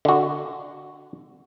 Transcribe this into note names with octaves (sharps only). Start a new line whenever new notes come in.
D3 F#4